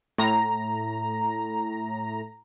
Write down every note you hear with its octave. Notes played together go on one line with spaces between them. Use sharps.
A2 A#5